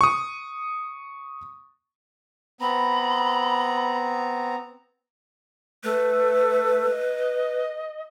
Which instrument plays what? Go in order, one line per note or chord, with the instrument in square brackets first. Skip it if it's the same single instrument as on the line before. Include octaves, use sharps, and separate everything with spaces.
[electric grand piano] C#6 D#6
[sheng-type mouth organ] B3 C4 A#5 [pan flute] B5
[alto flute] A3 [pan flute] B4
[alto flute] D#5